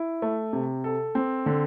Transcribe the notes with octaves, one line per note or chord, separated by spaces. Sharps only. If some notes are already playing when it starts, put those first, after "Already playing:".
Already playing: E4
A3
C3
A4
C4
D3